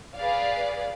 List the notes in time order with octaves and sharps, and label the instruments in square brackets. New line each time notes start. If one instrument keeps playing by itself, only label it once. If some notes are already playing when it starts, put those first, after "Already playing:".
[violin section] G#4 B4 D5 F5